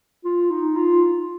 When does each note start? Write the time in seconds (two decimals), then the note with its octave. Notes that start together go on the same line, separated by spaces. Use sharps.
0.24 F4
0.50 D#4
0.76 F4